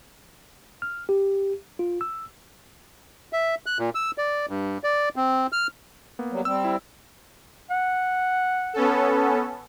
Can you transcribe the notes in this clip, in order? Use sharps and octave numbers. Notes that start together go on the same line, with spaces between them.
F6
G4
F4
E6
E5
F#6
A#2
E6
D5
G2
D5
C4
F6
A#3 B3
F#3 G3
G3 C4 E6
E4
F#5
B3 C#4 A4